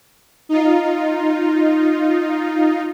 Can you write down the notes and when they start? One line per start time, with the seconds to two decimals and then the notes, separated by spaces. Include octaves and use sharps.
0.49 D#4 F4